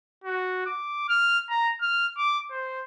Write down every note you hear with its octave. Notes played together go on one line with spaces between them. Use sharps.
F#4
D6
F6
A#5
F6
D6
C5